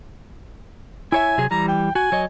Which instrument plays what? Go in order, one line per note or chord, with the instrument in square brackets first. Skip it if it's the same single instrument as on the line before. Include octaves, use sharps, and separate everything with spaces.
[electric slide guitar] E4 C#5 E5 [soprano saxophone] G#5
[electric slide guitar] C3 F#3 G#4
[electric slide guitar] E3 G3 [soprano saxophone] A#5
[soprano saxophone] G5
[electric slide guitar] F#4 [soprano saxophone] G#5
[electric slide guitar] F#3 C#5 D#5